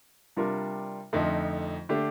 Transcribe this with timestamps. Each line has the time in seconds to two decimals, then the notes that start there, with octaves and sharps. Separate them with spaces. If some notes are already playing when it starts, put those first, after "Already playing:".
0.37 C3 G3 D4 F4 A#4
1.13 F2 D3 F3 A3 D#4
1.89 D3 A3 D4 G4